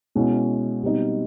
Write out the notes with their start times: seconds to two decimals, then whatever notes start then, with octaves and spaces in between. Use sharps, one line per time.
0.15 B2 G#3 C#4 E4
0.83 B2 G3 C4 D#4